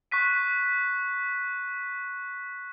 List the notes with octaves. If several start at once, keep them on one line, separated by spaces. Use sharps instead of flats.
C#6 F#6 B6 D#7